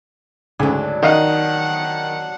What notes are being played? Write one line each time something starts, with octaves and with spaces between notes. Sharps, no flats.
D2 G#2 C#3 F#3 D4
D#3 D#4 D#5 F5 F#5